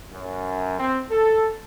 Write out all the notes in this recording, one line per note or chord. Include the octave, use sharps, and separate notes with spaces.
F#2
C4
A4